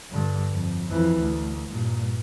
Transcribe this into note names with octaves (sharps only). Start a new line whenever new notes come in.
G2 D3
F2
F2 E3
D2
G2 A#2